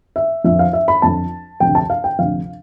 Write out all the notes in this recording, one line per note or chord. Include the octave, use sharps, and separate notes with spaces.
E5
F2 D3 F3 E5
F5
E5
B5
F2 D3 F3 A5
D2 C3 F3 G5
A5
F5
G5
D2 C3 F3 F5